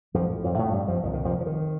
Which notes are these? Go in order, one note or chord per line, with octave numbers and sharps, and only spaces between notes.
A#1 F2 A2 F3
F2 F3
A2 A3
G2 G3
F2 F3
C2 A#2 D#3
D#3
F2 F3
F3
D#3